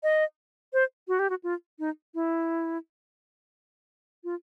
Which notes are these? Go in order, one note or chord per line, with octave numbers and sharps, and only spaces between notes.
D#5
C5
F#4
G4
F#4
F4
D#4
E4
F4